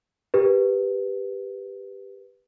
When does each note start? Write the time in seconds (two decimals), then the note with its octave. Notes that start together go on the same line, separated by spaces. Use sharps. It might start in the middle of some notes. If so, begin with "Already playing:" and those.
0.34 G4 A#4 B4